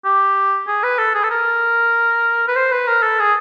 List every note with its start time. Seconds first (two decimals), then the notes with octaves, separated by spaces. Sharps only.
0.05 G4
0.68 G#4
0.83 B4
0.99 A4
1.15 G#4
1.24 A4
1.30 A#4
2.48 B4
2.56 C5
2.72 B4
2.87 A#4
3.03 A4
3.19 G#4